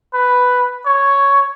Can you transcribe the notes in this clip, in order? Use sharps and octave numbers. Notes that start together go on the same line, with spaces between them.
B4
C#5